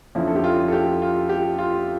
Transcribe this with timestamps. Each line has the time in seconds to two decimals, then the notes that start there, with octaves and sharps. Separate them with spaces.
0.15 F2 D3 F3 C#4 E4
0.28 A4
0.36 G4
0.44 F4
0.68 A4
0.72 G4
1.02 F4
1.29 G4
1.58 F4